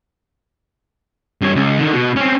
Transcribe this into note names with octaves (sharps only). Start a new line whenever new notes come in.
G2 C#5
C#2
D3 D#3
B2
C4 C#4